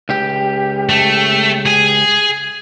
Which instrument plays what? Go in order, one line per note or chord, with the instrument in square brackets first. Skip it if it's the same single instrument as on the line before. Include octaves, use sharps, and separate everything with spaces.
[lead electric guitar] C#2 G4
[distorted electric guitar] A3
G#4 G#5